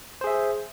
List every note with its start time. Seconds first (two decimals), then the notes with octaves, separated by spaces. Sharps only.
0.21 C5
0.24 G#4
0.27 E5